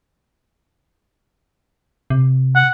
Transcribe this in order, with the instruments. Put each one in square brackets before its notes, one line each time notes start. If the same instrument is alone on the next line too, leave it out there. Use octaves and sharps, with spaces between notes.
[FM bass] C3
[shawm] F#5